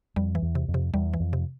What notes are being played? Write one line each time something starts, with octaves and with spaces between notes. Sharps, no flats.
F2 G3
E3
E2
C3
F2
C3
E2 G3
E3
F2
C3